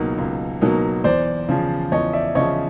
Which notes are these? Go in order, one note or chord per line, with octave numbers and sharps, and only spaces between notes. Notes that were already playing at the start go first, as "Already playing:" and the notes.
Already playing: C#2 B2 F#3 A#3 D#4
C#2
B2 F#3 A#3 D#4
E2 C5 D5
C#3 F3
E2 C#5 D#5
D5 E5
C#3 F3 C#5 D#5